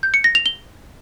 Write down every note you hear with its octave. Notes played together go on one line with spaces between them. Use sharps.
G6
C#7
A#6
F7
G7